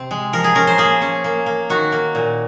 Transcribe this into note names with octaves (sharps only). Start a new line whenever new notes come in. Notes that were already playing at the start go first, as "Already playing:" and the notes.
Already playing: C3 C4
G#3
F3 A#4
G#4
C#4 A#4
C5
A#3 G#4
C#4
A#3
A#3
D#3 F#4
A#3
A#2